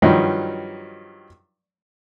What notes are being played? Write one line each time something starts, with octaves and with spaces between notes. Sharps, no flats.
G2 D#3 F3 F#3 D#4